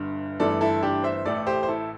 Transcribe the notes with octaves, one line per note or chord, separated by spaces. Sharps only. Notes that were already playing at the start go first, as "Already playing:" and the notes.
Already playing: G1 G2 D3
G1 G2 E3 A3 A4 D5
E4 A4
D4 G4
C5 E5
A1 A2 A3 A4 D5
G4 C5
C5
E4 A4